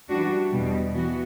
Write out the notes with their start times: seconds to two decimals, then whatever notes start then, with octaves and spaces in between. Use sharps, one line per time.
0.09 E3 G3 D4 F#4
0.51 E2 B2 G3
0.93 E3 B3 F#4